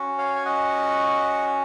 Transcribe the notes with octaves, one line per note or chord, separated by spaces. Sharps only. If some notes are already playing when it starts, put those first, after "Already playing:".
Already playing: C#4 F#4
C#5 F5
G#5
D#5 F#5